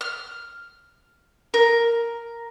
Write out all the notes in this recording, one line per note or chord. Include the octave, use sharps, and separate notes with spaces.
F6
A#4